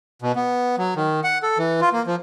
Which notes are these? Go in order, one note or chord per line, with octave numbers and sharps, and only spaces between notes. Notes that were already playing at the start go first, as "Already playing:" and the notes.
B2
B3
F#3
D#3
F#5
A4
E3
F4
A#3
F3